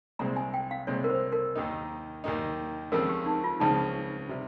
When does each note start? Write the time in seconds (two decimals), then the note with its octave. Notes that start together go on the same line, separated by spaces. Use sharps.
0.19 C2 A#2 G#3 C4 A#5
0.36 G#5
0.54 G5
0.71 F5
0.87 C2 A#2 G#3 C4 C#5
1.04 A#4
1.10 C5
1.32 A#4
1.55 D#2 D#3 A#3 D#4
2.24 D#2 D#3 A#3 D#4
2.92 C#2 C#3 F3 C4 A#4
3.09 G4
3.26 D#4
3.44 F4
3.60 C#2 C#3 F3 C4 D#4
4.29 C3 G3